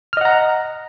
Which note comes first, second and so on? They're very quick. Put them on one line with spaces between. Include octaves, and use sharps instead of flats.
F6 D#5 F#5 A#5